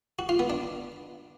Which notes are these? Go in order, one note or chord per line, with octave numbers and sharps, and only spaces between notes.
F#4
F4
B3
D4